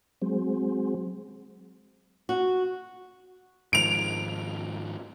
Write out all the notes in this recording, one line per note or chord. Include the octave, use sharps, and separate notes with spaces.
F#3 G#3 C4
F#4
G#2 D#3 F3 D7 F7